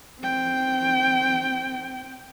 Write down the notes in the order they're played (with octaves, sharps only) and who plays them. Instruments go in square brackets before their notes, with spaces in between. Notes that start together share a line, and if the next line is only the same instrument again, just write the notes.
[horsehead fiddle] C4 G5